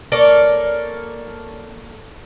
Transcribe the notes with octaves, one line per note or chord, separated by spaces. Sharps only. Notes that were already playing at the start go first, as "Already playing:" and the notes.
A#3 A4 C#5 D5